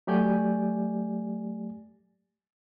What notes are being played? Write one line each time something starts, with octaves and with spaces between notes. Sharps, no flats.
F#3 A3 G4 D5 G#5 G6